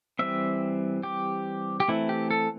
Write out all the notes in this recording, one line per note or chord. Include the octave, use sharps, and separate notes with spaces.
E3 G3 C4 E5
G4
G4
E3 A3 C4 E4
G4
A4